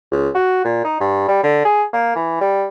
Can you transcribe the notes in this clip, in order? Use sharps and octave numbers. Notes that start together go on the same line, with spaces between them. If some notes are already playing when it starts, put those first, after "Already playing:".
C#2
F#4
A#2
D#4
G2
G3
D3
G#4
A#3
E3
G3